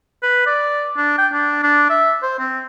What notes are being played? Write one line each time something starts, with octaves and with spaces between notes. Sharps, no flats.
B4
D5
D4
G5
D4
D4
E5
C5
C4